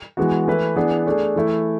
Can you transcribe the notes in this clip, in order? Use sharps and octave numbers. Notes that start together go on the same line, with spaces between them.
E3 G#3 B3 F#4
E3 A3 E4 B4
E3 B3 D4 G#4
A3 D4 G#4
E3 A3 E4